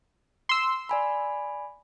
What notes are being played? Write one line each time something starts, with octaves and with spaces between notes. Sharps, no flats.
C6 E6
D5 G#5 B5